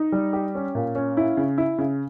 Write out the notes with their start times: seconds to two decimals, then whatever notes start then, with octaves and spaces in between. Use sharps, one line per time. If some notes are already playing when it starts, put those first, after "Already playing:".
Already playing: D#4
0.12 G3
0.33 G4
0.55 C#4
0.75 A#2
0.95 C#4
1.17 E4
1.37 C#3
1.58 E4
1.78 C#3